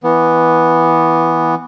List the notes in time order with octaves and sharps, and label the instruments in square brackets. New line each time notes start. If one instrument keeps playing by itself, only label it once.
[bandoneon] E3 B3